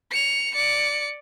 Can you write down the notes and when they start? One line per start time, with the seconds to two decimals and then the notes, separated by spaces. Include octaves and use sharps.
0.11 C#7 F7
0.54 D5 C#7